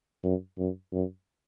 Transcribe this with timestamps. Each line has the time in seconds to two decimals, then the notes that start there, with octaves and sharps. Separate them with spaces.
0.24 F#2
0.58 F#2
0.93 F#2